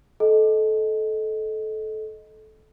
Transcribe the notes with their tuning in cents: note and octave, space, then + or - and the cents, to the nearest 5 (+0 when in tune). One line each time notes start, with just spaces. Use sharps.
A4 -20 D#5 +0